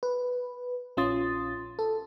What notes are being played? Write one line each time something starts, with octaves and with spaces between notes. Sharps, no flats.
B4
A#1 C#4 F4 C6 D#6 A6
A4